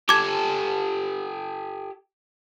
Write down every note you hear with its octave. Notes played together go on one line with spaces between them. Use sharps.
G4 A4 D6 G#6